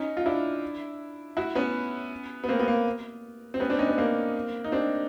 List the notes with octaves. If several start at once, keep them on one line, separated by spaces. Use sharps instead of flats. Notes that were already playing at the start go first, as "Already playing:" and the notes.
Already playing: C#4 D#4
F4
D4 E4
E4 F#4
B3 C#4
B3
A#3 C4
B3
A#3
C4
B3 C#4
C4 D4
C#4 D#4
B3
A#3 C4
D#4
C4 D4